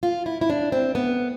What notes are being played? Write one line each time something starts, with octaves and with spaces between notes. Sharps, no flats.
F4
E4
E4
D4
C4
B3